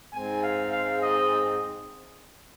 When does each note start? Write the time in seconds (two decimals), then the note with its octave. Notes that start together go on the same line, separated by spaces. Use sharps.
0.13 G#2 G#3 C4 G#5
0.43 F5
0.73 F5
1.03 D#5